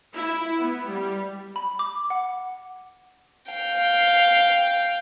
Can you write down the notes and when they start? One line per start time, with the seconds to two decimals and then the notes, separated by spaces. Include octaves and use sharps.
0.15 E4
0.58 B3
0.88 G3
1.56 B5
1.79 D6
2.10 F#5
3.52 F5 G5